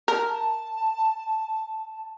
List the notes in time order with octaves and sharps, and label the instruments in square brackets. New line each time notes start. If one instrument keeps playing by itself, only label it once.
[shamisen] A#4 [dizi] A5